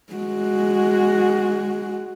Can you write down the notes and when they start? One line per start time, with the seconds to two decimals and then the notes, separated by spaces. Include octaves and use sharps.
0.13 G#3 F#4